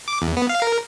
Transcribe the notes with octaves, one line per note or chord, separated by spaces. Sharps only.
D6
E2
B3
F5
A#4